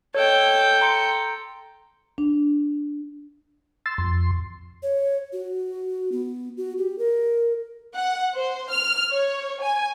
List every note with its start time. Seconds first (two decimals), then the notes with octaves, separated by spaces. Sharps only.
0.15 A4 C#5 D#5 G5
0.81 A#5 C6 C#7
2.18 D4
3.86 C6 E6 A6
3.98 F2 C6
4.83 C#5
5.33 F#4
6.12 B3
6.57 F#4
6.78 G4
6.98 A#4
7.95 F#5
8.35 C5
8.70 F6
9.10 C#5
9.61 G#5